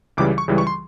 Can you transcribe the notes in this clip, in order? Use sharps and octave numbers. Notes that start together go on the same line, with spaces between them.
C#2 C#3 E3 G3 D6
C#6
C#2 C#3 E3 G3
C#6
C6